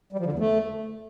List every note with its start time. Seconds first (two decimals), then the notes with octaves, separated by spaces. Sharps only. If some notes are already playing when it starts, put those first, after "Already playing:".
0.12 G3
0.19 F3
0.26 D3
0.32 E2
0.39 A3